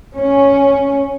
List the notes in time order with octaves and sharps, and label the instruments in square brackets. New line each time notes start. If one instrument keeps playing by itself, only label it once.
[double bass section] C#4